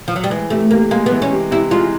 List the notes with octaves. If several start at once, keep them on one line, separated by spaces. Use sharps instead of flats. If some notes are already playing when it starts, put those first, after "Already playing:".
F3
F#3
G3
E3 G#3
C3 A3
C3 A#3
G#3 A#3
E3 B3
C#4
C3
C3 E4
G#3 F4